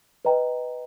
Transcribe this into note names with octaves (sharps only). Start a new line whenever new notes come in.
B4 D#5 G5 A#5